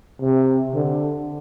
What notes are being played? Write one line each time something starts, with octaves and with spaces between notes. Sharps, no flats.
C3
D3